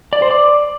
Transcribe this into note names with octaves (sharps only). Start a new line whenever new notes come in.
D5
C5
D5